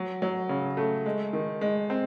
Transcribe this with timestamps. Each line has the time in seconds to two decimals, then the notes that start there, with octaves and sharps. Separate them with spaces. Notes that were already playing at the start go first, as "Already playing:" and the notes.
Already playing: F#3
0.22 F#3
0.49 C#3
0.77 A3
1.06 G#3
1.33 D#3
1.61 G#3
1.90 C4